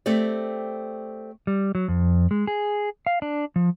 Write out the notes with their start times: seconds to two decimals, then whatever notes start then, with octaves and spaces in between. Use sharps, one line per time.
0.06 A3 C4 G4 D5
1.47 G3
1.75 F#3
1.88 F2
2.31 G#3
2.47 G#4
3.07 F5
3.22 D4
3.56 F3